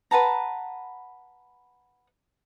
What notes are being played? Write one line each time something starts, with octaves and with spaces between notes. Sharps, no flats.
B4 F#5 A5 A#5